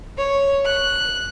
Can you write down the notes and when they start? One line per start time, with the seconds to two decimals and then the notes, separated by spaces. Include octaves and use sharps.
0.17 C#5
0.63 F#6